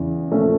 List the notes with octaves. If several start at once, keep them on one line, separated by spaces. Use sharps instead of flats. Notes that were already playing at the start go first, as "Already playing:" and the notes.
Already playing: E2 C#3 E3
A#2 F3 A3 C#4